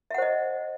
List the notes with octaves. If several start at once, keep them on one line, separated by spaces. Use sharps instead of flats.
C5 D#5 E5 F#5